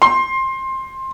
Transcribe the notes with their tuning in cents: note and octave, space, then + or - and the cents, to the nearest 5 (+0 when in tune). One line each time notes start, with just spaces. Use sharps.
C6 +15